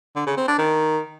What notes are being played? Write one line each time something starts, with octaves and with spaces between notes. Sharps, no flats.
D3
C#3
C4
D4
D#3